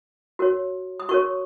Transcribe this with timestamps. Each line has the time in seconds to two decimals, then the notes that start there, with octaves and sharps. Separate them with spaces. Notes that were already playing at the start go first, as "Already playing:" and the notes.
0.39 F#4 A#4 C#5
1.00 D#6
1.09 F#4 A#4 C#5 C#6